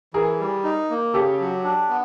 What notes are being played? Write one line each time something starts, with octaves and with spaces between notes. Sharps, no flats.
E3 G#4 A#4
G3
D#4
A#3
C#3 G4 A4
F#3
D4
B3